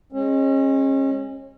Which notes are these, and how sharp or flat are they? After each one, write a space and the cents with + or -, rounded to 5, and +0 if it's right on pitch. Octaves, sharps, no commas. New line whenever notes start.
G#3 -15 C#4 -35